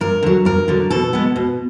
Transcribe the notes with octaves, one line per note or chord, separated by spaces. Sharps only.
G2 A#4
D3 F#3
G2 A#4
D3 F#3
B2 A4
G#3 B3
B2